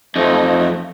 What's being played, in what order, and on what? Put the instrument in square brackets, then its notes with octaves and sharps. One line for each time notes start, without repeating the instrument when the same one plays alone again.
[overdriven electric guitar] F2 D#4 [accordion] F3 A3